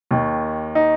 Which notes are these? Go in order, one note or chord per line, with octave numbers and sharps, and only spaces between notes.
D#2 D#3
D#4